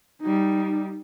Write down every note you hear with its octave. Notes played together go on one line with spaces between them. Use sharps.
G3 D#4